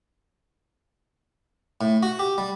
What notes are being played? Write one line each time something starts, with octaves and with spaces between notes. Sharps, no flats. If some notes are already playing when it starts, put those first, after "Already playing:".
A2
F#4
G4
G3